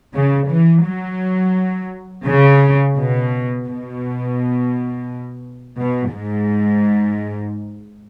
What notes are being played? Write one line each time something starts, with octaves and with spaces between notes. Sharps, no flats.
C#3
E3
F#3
C#3
B2
B2
B2
G#2